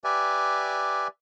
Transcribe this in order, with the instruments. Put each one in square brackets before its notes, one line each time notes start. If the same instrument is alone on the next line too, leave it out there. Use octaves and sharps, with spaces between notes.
[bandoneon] G4 B4 D5 E5 G#5